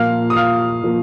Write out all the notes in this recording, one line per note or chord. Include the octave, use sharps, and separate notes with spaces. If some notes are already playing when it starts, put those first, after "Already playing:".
Already playing: A#2 F3 A#3 F5 F6
D#6
F5 F6
A#2 F3 A#3